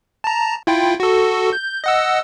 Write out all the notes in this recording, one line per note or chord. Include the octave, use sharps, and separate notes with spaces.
A5 A#5
E4 F4 G5
F#4 A4
G6
D#5 F#5 E6